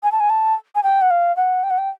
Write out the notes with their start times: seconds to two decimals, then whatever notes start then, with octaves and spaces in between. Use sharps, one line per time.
0.03 G#5
0.12 A5
0.20 G#5
0.30 A5
0.75 G#5
0.83 G5
1.01 F#5
1.10 F5
1.36 F#5
1.63 G5
1.70 F#5
1.78 G5